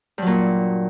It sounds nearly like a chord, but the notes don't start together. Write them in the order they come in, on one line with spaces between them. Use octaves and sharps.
G2 F#3 A#2